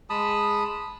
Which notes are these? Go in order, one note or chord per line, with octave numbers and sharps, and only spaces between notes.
G#3 A5 B5 D#6